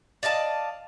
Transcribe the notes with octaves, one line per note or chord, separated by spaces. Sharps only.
D5 D#5 F5 A5